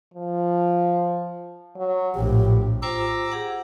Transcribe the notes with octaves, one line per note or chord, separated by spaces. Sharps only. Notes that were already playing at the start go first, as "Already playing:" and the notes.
F3
F#3
A#1 A2 G4
F4 C5 G5 A#5 D6 E6
G4 G#4 F#5